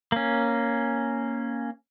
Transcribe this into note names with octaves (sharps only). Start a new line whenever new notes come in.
A#3 C#4